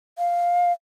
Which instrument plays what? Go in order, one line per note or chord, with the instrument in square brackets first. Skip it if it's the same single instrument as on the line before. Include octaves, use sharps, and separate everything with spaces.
[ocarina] F5